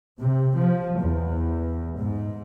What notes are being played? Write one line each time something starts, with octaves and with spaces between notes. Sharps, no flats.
C3
F3
E2
G#2